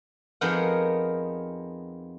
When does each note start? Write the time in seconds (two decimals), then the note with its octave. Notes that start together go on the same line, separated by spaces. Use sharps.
0.41 F2 B3 D#4 G#4 A#4 F#5